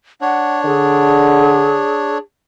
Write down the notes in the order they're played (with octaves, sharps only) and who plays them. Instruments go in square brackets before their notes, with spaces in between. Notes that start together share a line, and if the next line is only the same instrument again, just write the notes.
[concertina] D4 C#5 [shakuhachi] F#5
[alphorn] D3 [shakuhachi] G#4